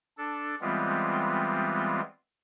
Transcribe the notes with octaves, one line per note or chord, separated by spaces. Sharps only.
D4 A4
E3 G3 G#3 B3 C4 F4